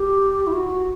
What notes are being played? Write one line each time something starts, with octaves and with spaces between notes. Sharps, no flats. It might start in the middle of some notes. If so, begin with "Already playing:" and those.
Already playing: G4
E4
F#4